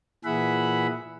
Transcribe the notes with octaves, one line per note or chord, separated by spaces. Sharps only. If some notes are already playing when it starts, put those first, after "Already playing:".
A#2 E3 G#4 E5 F#5 B5